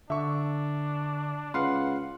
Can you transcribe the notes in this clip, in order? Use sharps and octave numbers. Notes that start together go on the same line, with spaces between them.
D3 D4 E5 C#6
C#2 B4 F5 F#5 C6